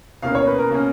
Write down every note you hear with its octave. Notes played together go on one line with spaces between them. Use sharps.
B2 A#3 C#4 F5
C#5
B4
A#4
B2 A#3 C#4